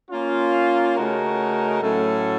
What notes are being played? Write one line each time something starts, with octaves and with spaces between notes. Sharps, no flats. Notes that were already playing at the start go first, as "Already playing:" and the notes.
A#3 C#4 F4
C#3 A3 D#4 F#4 A#4
A2 F#3 A3 C#4 A4